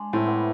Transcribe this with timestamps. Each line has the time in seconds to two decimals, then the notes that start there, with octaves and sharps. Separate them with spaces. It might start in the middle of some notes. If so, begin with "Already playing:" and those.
Already playing: G#3 D4
0.13 A2 C4 E4
0.26 B3 D4